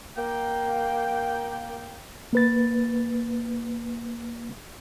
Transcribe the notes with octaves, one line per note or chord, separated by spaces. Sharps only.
A#3 G5
A#3 B4 A6